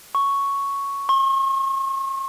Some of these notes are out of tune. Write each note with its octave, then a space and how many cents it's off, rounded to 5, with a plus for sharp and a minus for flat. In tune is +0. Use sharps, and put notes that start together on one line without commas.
C#6 +0
C#6 -45